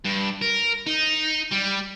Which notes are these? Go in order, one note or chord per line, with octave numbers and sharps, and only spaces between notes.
G2
A#4
D#4
G3